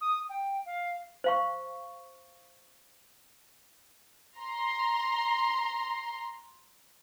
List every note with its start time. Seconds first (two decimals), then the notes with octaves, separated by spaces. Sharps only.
0.01 D#6
0.29 G5
0.66 F5
1.24 C5 F5 C#6
4.37 A#5 C6